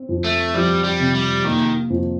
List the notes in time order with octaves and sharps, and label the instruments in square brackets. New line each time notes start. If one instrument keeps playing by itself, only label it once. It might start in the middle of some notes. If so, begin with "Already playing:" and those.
Already playing: [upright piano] C4
F2
[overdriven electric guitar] A3
[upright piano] F3 [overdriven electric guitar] G3
[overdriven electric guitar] G3
[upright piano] C3
[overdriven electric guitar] G3
[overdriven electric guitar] D#3 [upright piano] A#3
[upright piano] F2